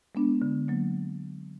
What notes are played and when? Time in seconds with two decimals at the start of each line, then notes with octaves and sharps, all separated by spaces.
0.15 G#3 B3 D4
0.42 D3
0.68 F#3 A#3